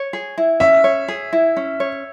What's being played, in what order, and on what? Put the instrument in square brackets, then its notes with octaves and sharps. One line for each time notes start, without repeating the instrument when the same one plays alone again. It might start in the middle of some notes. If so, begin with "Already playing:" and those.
Already playing: [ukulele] C#5
G#4
E4
[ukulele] C#4 [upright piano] E5
[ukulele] C#5
G#4
E4
C#4
C#5